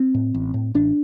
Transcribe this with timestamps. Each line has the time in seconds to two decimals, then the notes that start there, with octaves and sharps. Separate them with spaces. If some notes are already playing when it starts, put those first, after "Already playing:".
Already playing: C4
0.14 A2
0.34 A1
0.54 A2
0.74 A1 D4